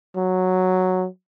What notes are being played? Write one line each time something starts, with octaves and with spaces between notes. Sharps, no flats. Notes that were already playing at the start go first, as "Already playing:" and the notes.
F#3